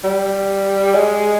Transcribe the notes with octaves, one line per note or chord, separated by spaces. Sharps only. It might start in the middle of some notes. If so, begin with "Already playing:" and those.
G3
G#3